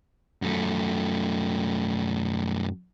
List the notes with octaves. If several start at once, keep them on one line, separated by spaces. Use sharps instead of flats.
F#2 A3